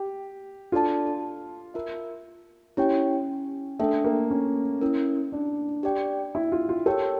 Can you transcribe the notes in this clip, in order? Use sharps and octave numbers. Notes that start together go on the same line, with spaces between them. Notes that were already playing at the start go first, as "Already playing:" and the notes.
Already playing: G4
D4 F4 A4 D5 A5
F4 A#4 E5
C#4 E4 G4 C#5 G5
A3 D4 A4 E5 G5
A#3
C#4
C#4 E4 A#4
D4
G4 D5 G5
E4
F4
F4
G4 A4 A#4 C#5 G5